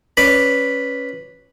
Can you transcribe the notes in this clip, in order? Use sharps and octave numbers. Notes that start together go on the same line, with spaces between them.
C#4 B4 D5 B5